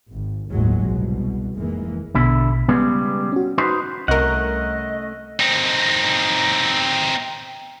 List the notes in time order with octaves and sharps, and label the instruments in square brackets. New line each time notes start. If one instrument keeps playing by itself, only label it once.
[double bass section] G#1
G1 D#2 A2 F#3 G#3
C2 B2
F1 E3 G#3 A#3
[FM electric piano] A#1 B2 [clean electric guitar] D3 E4
[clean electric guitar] C#3 G3 G#3 [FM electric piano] B3
[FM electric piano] C#4 F#4
[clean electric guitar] D#4 B4 C5
[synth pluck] C2 A#4 [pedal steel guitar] A3 C#4 F#5 [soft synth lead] D#5
[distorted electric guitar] C4 D#4